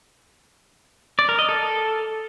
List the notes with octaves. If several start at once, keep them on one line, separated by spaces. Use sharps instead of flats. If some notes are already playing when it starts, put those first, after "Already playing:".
D5
A#4
D#5
A4